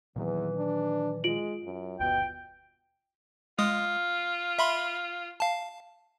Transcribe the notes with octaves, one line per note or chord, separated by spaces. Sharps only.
E2 A#2 D#3 E3 F#3
D4
G#3 F4 D7 F#7
F#2
G1 D#2 B2 G5
G#3 F4 D#6
E5 B5 C6
F5 A5